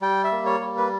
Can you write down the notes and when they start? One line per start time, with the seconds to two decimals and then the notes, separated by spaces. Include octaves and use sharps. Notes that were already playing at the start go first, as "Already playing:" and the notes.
0.02 G3 G5
0.24 E5
0.32 A#3
0.46 C#5
0.60 G3
0.77 B4